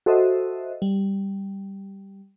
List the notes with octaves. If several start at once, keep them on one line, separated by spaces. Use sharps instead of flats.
F#4 A4 C5 D#5 E5
G3